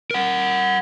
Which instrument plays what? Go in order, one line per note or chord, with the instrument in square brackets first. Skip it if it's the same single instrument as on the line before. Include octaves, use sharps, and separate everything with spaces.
[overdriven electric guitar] A#4 F#5